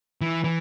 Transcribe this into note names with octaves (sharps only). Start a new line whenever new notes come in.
E3
E3